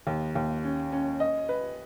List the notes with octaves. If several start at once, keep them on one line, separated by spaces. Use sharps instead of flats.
D#2
D#2
C#4
C#4
D#5
B4